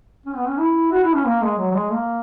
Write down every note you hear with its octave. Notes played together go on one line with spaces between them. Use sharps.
C#4
B3
C#4
E4
F#4
E4
C#4
A#3
G#3
F#3
F#3
G#3
A#3